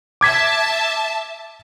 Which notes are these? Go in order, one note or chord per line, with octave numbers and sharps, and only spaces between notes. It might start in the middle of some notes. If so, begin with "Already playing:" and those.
E5 A5 D6 G#6 B6